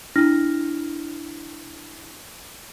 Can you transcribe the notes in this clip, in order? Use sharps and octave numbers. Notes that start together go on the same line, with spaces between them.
D4 E4 F6 A#6